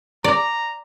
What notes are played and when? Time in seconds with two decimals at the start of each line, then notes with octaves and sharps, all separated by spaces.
0.24 D5 A#5